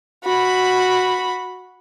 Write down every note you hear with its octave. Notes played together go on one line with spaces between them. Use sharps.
F#4 B5